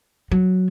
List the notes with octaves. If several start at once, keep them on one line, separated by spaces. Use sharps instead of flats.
F#3